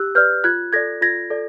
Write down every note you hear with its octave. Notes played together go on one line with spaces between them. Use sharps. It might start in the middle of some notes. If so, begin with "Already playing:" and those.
Already playing: G4 E6 F#6
B4 D5 F6 G6
F4 F#6 G#6
A4 D5 G#6 A#6
F4 G#6 A#6
A4 D5